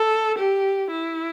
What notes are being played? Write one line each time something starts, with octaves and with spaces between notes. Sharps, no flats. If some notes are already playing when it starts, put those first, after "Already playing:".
Already playing: A4
G4
E4